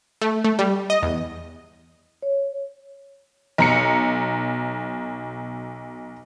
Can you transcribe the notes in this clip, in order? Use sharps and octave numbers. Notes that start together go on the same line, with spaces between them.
A3
A3
G3
D#5
E2
C#5
B1 A#5 C#7